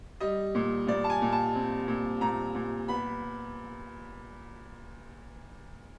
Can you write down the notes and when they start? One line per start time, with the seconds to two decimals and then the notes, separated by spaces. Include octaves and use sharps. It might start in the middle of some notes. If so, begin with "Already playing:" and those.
0.20 G3 D#5
0.55 A#2
0.87 A#2 D5
1.04 A5
1.10 G#5
1.22 A#2
1.32 A5
1.55 C4
1.88 A#2
2.21 A#2 A#5
2.55 A#2
2.88 B3 B5